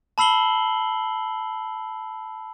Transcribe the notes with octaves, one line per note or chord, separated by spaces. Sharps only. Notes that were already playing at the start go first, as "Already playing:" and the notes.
A5 B5 E6 C7 F#7 G7